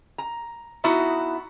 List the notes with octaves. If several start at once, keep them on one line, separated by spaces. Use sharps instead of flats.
A#5
B3 D#4 E4 F#4